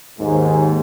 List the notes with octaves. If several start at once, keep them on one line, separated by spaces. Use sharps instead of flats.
D#2 G#2